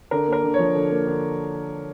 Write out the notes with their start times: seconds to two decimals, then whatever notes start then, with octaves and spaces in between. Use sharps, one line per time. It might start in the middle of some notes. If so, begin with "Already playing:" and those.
0.11 D3 A#4
0.28 A#3 A#4
0.44 D3
0.54 C#5
0.59 F3
0.75 D3
0.91 A#3
1.07 D3